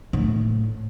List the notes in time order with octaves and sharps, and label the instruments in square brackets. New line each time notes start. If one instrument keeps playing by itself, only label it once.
[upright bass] A2